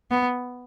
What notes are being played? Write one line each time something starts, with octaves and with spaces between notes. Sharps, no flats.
B3